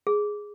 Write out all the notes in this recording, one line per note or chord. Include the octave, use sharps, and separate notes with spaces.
G#4